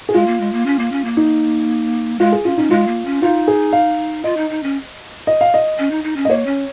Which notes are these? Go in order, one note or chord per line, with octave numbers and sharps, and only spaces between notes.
G#4
G#3 F4
A#3
G#3
A#3
C#4
A#3
C#4
A#3
D#4
G#3 F4
G#4
C#4 F4
C#4 D#4
G#3 F4
A#3
C#4
D#4 F4
G#4
F5
F4 D#5
D#4
D#4
C#4
D#5
F5
D#5
C#4
D#4
D#4
C#4
D#5
A#3 C#5
C#4